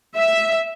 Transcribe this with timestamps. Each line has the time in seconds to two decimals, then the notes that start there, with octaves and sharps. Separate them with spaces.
0.18 E5